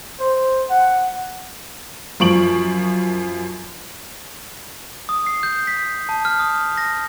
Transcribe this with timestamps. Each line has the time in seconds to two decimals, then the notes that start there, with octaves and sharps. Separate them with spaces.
0.19 C5
0.69 F#5
2.20 F#2 F3 C#6 D7 F#7
5.09 D#6
5.27 C7
5.43 G6
5.67 B6
6.09 A5
6.25 F6
6.40 D#6
6.78 A#6